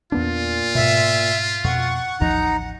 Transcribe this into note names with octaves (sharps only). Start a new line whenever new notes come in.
E2 A#2 B3 D4 F4
G#2 B2 E5
F2 B2 F#5 C#6
A1 D#2 F3 D#4 A#5